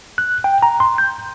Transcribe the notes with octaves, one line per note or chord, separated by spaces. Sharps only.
F#6
G5
A#5
C6
G6